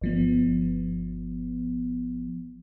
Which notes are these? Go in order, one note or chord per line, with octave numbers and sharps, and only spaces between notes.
G1 F3 B3